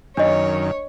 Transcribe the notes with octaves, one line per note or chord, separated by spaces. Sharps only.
F#2 D#3 D4 C#5 D#5